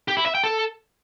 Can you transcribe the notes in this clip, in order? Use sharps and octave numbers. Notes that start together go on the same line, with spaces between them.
G4
E4
E5
G5
A4